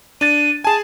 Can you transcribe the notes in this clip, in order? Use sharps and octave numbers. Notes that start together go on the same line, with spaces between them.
D4 A6 D#7
G#4 G#5 A5